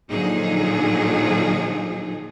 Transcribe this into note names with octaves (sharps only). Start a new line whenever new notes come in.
A#2 D3 F3 F#3 D#4 G#4